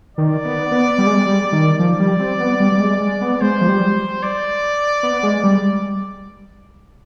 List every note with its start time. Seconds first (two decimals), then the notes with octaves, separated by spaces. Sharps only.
0.17 D#3 D5
0.45 B3
0.71 B3
0.98 G3
1.07 G#3
1.15 G3
1.26 G3
1.52 D#3
1.79 F3 D5
2.00 G3
2.19 C4
2.40 B3
2.60 G3
2.72 G3
2.80 G#3
3.01 G#3
3.21 B3
3.41 G#3 C5
3.61 F3
3.68 G3
4.23 D5
5.03 B3
5.23 G#3
5.44 G3